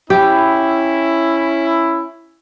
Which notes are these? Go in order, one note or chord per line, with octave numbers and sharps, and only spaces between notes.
C#4 E4 G4